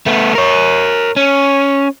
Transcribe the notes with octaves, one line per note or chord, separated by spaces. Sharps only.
A3 B3
A#4 C#5
C#4